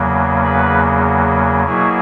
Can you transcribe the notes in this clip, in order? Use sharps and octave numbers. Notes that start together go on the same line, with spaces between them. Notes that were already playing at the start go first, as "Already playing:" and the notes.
Already playing: E2 C#3 F#3 A#3
B4
B2 F#3 A#3 E4 G#4